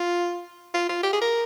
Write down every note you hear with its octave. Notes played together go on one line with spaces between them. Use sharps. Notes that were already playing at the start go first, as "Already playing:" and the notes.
Already playing: F4
F4
F4
G4
G#4
A#4